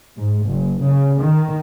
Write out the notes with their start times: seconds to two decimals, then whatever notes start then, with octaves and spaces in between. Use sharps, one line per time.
0.17 G#2
0.48 F#1
0.82 C#3
1.20 D#3